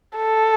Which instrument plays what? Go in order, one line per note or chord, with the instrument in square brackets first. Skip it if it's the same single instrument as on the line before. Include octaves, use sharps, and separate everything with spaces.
[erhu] A4